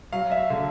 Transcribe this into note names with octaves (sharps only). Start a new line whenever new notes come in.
F#3 F5
E5
D3